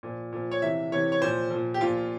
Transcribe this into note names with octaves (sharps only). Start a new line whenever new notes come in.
A#2 F3
A#2 F3
C#5
C3 E3 E5
C3 E3 C#5
C#5
A#2 F3 C5
A#2 F3
G4
A#2 F3 F4